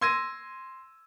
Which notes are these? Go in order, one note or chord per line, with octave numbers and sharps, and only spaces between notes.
C6 E6 G#6 A#6 D#7